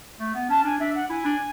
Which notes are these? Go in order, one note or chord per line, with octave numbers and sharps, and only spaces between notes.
A3
B3
C#4 A5
D4 G#5
D4 E5
F#5
E4 G#5
D4